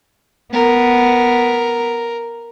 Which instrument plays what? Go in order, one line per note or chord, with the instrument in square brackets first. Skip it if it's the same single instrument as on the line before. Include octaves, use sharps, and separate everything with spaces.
[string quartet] B3 [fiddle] A#4